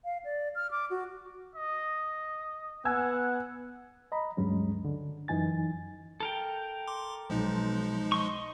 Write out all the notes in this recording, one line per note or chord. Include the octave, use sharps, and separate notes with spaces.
F5
D5
F6
D6
F#4
D#5
B3 F#5 G#5 E6 G#6
D#5 A#5 B5
D2 G2 F#3 G#3 C#4
D3
F#2 E3 D#4 G#5 A6
A4 A#4 G5
C6 D6
B1 F3 G#3 D#4
D#5 C6 C#6